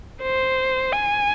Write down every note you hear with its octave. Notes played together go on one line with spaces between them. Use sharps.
C5
G#5